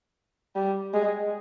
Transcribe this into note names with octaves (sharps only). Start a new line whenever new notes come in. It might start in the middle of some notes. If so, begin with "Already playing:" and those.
G3
G#3